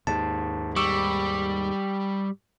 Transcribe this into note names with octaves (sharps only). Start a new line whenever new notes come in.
D#2 G#2 A5
G3 C#6 D6 E6